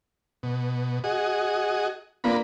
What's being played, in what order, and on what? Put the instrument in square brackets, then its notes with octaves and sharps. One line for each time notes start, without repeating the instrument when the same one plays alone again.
[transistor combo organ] B2
F#4 G#4 D#5
[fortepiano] A#3 D4 F4 [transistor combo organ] B3 A#4 B5